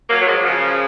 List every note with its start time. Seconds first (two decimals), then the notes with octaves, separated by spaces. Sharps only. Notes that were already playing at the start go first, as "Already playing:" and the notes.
0.08 F#3 A#3
0.20 F#3
0.25 F3 G#3
0.37 F#3
0.43 C#3 F3